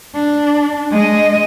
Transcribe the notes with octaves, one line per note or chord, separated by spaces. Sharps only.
D4
G#3 D#5